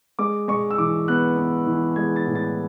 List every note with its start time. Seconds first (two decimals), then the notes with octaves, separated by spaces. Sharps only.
0.19 G#3 D6
0.48 G#3 C#6
0.71 E6
0.78 E3 D6
1.08 B3 F#6
1.37 B3
1.67 E3
1.96 G#3 G#6
2.16 A6
2.26 A2
2.35 A6